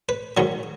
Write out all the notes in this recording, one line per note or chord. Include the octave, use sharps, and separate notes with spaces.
B4
G#2 D#3 F#3 C#5